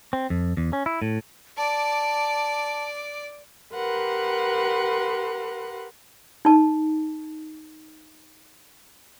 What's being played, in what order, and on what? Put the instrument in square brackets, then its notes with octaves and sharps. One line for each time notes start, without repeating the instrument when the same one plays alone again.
[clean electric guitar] C4
F2
E2
C#4
E4
A2
[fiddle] D5 D6 [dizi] A5
[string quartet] G4 A#4 B4 F#5 C6
[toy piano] D#4 A5